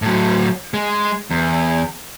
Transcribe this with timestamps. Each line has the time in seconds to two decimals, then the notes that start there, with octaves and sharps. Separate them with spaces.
0.02 A2 F#3
0.74 G#3
1.31 E2